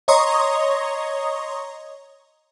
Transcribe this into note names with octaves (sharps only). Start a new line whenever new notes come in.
C#5 D#5 A#5 C6 C#6 D#6